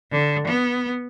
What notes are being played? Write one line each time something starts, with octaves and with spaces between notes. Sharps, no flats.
D3
B3